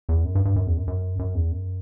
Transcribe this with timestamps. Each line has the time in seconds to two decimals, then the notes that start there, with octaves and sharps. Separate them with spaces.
0.09 E2
0.25 F#2
0.35 G2
0.45 G2
0.56 F#2
0.67 E2
0.77 F#2
0.88 F#2
1.19 F#2
1.35 E2
1.51 F#2